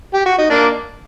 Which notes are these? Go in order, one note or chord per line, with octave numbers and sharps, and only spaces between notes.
G4
F#4
D#4
A#3 D4